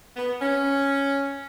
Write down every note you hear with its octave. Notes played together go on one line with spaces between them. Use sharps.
B3
C#4